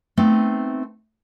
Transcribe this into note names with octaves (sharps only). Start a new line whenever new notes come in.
A3 B3 C4 D#4